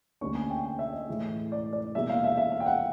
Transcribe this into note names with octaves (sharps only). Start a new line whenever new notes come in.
D2 D3 G3 A#3 C#4 C#6
G#5
G5
G5
E5
D#5
A2 E3 G#3
D5
D5
E1 E2 B2 G3 A#3 E5
F5
E5
E5
F5
G5
F#5